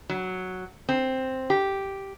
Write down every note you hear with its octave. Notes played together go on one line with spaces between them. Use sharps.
F#3
C4
G4